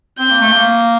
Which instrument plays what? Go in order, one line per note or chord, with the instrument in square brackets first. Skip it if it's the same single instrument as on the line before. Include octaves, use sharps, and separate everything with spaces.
[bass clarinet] C4 [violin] G6
[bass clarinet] A#3
A3
A#3